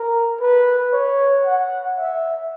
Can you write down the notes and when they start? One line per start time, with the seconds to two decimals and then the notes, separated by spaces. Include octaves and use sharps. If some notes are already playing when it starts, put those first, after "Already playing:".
Already playing: A#4
0.41 B4
0.93 C#5
1.45 F#5
1.98 E5